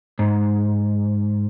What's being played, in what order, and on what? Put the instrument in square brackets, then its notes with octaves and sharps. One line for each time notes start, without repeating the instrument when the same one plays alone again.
[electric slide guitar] G#2